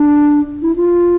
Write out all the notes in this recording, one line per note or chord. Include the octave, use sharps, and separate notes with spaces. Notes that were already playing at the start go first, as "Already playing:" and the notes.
Already playing: D4
E4
F4